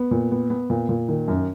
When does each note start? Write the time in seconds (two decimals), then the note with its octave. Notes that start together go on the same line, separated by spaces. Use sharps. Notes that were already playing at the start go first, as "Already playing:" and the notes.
Already playing: B3
0.11 A#2
0.32 B3
0.50 B3
0.70 A#2
0.89 A#2
1.08 D#3
1.28 F#2